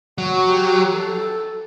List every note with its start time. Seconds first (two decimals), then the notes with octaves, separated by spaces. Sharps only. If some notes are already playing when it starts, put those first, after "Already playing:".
0.18 F#3 F#4
0.48 G4
0.95 A4